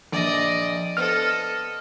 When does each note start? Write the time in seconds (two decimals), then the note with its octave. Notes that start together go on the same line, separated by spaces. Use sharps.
0.12 A#1 D5 D#5
0.97 B3 A4 C5 D#5 F6